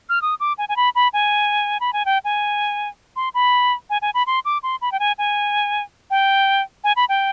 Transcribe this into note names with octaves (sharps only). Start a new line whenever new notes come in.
F6
D#6
D6
G#5
G#5
B5
B5
G#5
B5
G#5
G5
G#5
C6
B5
G#5
G#5
B5
C6
D6
C6
B5
G5
G#5
G#5
G5
G#5
B5
G5